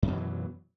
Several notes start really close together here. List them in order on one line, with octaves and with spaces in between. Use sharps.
F#2 B2 E3 F#3